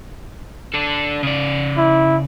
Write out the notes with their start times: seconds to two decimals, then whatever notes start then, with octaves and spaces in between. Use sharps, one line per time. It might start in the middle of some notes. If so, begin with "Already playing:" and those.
0.74 D4 A4
1.23 C#3 D5
1.77 E4